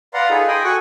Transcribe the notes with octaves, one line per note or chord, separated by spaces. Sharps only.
B4 D5 F5 F#5 A#5 C6
D#4 F4 G#4 A4 B4
D#5 G5 G#5 B5 C6 D#6
F#4 A4 G#5 C#6 F#6